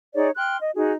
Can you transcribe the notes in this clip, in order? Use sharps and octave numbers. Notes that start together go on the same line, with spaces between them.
D#4 G#4 C#5 D5
G5 C6 F6 F#6
D#5
D#4 F#4 G#4